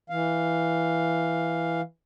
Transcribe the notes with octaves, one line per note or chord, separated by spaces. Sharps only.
E3 F5